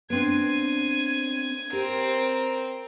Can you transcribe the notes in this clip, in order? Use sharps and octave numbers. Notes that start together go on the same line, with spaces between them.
B3 C4 D4 G#6 D#7
C4 G4 A#4